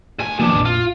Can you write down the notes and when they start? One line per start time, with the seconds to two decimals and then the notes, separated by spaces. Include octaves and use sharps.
0.19 D2 G#5
0.39 B2 D#3 F3 A#3 D4
0.51 F1 A#1
0.65 F4